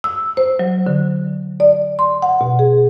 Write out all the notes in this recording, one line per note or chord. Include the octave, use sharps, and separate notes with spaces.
E6
C5
F#3
D3
D5
C6
F#5
B2
G#4